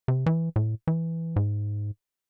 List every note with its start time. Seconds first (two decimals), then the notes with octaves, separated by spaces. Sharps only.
0.08 C3
0.26 E3
0.56 A2
0.87 E3
1.36 G#2